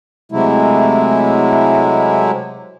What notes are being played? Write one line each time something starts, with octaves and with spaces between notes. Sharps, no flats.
C3 F#3 G#3 A3 E4